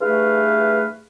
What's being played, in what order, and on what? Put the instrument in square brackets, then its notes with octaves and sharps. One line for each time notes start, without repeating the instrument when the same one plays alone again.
[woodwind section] G2 E3 A3 G#4 B4 F5